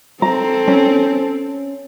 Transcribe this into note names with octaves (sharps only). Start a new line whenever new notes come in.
C4 A4 A#5
C#4